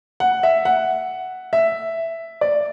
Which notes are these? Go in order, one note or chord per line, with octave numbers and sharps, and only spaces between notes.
F#5
E5
F#5
E5
D5